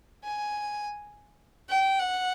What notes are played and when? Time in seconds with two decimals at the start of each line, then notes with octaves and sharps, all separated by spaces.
0.24 G#5
1.69 G5
1.99 F#5